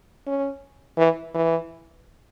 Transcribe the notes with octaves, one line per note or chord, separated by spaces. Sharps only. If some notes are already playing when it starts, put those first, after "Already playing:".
C#4
E3
E3